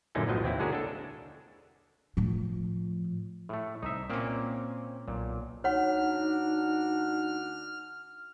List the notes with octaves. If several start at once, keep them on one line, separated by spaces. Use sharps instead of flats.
F#2 A#2 D3 C#4 D#4 E4
B1 A2 F3 F#3 D#5
D#2 C4 E4
D3 G#3 C#4 F#4 G#4 A#4
D4 A4
A2 F3
A2 A3
C2 D#4 E5
A#2 A#3 C4 C#4
B1 A#2
D2 D4 D#4 F#4 C#5 F#5 F6